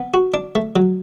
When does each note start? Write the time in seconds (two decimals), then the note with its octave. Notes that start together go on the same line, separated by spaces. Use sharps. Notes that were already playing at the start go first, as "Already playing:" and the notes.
Already playing: B3
0.14 F#4
0.34 D4
0.55 A3
0.76 F#3